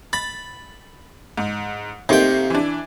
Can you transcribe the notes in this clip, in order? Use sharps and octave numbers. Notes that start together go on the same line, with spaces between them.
B5 A6
G#2
C3 A3 A#3 D#4 G5
E3 D4